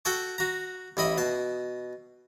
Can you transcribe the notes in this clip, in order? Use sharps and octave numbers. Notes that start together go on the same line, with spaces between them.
F#4 A4 G5 A5 C#6
F#4 A#5
A1 E4 D#5 B5
B2 A5